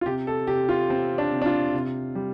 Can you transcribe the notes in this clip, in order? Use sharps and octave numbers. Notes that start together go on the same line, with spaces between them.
F4
C3 G4
A4
C3 G4
F4
C3 C4
D4
C3
D4
F4
C3
G3